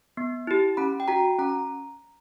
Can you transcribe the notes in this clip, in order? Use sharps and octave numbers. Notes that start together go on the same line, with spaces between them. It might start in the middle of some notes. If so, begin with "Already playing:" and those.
B3
E4 G4
C#4 B5
G5
F#4 A#5
C#4 A#5
A#5